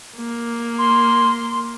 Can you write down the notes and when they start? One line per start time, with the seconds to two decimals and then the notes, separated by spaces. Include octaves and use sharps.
0.17 A#3
0.78 C6